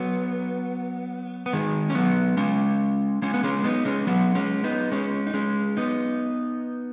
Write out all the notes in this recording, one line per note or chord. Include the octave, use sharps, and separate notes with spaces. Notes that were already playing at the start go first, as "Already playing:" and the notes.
Already playing: F#3 B3
B3
D#3 G#3
C#4
F#3 B3
G#3 C#4
G#3 C#4
B3
G#3 C#4
B3 D#4
G#3 C#4
F#3 B3
G#3 C#4
B3 D#4
G#3 C#4
D#4
G#3 C#4
B3 D#4